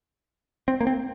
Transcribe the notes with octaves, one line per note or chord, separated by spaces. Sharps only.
C4
A#3
C4